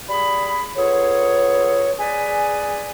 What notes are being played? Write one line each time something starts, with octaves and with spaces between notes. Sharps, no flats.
G3 G#4 B5
B3 F4 G#4 A4 C#5
G#4 B4 D5 G#5